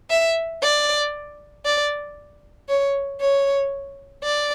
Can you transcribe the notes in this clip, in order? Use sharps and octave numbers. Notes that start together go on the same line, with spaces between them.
E5
D5
D5
C#5
C#5
D5